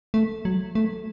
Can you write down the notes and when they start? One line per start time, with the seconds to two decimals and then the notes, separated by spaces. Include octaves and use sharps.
0.14 A3
0.45 F#3
0.75 A3